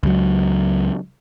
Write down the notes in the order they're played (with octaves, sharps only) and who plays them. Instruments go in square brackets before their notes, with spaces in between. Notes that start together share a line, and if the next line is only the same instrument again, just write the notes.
[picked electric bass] C#2 F#3